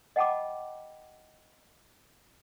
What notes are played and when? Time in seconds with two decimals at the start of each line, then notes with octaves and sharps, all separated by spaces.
0.16 D#5 F#5 G5 A5 B5 D6